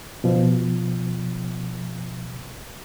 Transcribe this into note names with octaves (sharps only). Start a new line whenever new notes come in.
B2 F3